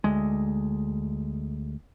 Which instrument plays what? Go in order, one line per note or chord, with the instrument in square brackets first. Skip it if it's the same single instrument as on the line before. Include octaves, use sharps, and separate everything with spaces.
[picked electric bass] D2 G#3